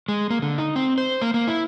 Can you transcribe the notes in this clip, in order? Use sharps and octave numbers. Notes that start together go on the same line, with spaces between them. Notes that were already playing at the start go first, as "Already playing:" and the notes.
G#3
A#3
D3
D#4
C4
C5
A#3
A#3
E4